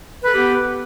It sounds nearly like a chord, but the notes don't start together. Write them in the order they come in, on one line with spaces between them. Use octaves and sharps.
B4 A4 G4 B3